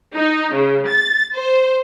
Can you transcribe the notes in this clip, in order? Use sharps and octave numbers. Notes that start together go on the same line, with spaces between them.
D#4
C#3
A6
C5